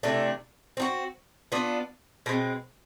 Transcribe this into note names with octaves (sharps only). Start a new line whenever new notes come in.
C3 E3 A3 D4
C4 D#4 F#4
B3 D4 F4
B2 G#3 C4